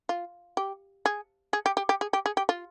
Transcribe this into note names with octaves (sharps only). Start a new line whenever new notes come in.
F4
G4
G#4
G#4
G4
G4
G4
G#4
G4
G#4
G4
F4